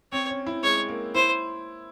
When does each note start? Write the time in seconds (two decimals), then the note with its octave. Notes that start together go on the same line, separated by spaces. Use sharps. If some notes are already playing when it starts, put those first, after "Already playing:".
0.12 C4 C#5
0.30 C#4
0.47 E4
0.63 G#3 C#5
0.89 A#3
1.15 E4 C5